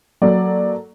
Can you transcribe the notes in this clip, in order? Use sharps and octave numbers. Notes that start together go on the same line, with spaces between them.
F#3 A#3 A4 D5